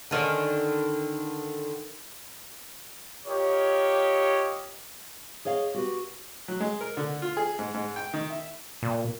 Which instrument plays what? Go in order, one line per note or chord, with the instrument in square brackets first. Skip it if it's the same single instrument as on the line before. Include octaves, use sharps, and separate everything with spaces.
[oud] D3 D#3 C#4
[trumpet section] F4 G4 A#4 C#5 D#5
[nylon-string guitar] G#4 C#5 D#5 F5
F#4 G4 B4
[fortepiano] F#3
G#3
A#4
D3
F4
G#4
G#2
G#2
G5
D#3
E5
[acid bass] A#2